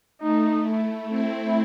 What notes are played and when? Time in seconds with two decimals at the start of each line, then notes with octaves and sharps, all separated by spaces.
0.20 A3 D#4
0.65 E4
1.08 C4 E4